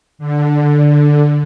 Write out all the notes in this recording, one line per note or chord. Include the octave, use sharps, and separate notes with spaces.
D3